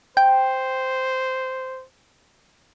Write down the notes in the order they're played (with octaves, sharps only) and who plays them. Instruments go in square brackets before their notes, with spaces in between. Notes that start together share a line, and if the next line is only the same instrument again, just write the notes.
[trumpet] C5 [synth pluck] G5